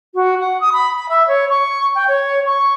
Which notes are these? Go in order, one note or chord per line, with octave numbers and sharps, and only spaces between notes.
F#4
F#5
D#6
B5
B5
E5
C#5
C#6
G5
C#5
C#6